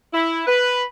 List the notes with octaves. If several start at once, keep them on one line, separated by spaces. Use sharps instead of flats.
E4
B4